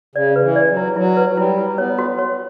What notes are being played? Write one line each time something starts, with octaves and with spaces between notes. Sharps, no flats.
C#3 D5
B4
E3
D5
F#3
E4
F#3 E4
B4
G3 E4
E4
B3 C#5
F#4
C#5